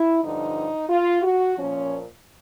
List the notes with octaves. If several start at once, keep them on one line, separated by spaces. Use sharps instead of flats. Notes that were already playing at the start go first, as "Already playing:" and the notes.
Already playing: E4
G2 D3 F3 D#4
F4
F#4
A#2 F3 C#4